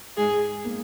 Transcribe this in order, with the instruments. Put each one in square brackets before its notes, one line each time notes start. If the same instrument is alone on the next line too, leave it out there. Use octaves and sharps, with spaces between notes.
[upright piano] G#2 [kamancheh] G#4
[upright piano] A#3